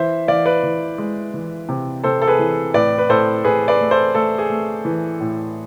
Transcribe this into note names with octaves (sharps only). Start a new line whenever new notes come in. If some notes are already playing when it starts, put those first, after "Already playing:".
Already playing: E3 C5 E5
E3 D5 F5
B4 D5
E3
G#3
E3
C3
C3 A4 C5
A4
G#4 B4
E3
A2 B4 D5
B4
A2 A4 C5
A2 G#4 B4
B4 D5
A3
A4 C5
A3 A4
G#4
A3
E3
A2